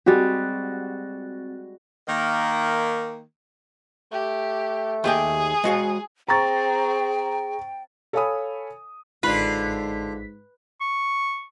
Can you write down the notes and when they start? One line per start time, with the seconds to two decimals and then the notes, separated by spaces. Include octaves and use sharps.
0.06 G3 G#3 C4 F#4 G4 F#6 A6
2.08 D#3 A#3
4.12 A3 G4
5.04 D#2 G4 G#4 G5
5.64 G#3 F#4 F5
6.28 C4 G#4 G5 A#5 C#6 A6
8.13 A4 C#5 F5 G#5 B5 D#6
9.23 A1 G#2 D3 F4 B4 B6
10.81 C#6